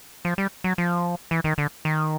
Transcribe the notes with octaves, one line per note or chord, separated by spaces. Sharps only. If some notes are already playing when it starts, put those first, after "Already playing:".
F3
G3
F#3
F3
E3
D#3
D3
D#3